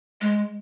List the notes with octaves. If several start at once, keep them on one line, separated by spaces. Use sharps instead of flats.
G#3